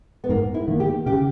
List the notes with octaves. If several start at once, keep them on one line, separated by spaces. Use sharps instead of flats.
B3
G#2 A#3
E4
D#3 A#3
G4
C#3 G4